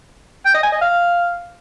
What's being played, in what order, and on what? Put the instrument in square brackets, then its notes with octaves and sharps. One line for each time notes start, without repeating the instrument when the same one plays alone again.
[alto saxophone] G5
D#5
G#5
D#5
F5